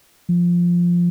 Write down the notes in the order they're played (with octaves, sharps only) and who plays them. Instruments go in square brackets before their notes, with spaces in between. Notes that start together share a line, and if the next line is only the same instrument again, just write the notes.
[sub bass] F3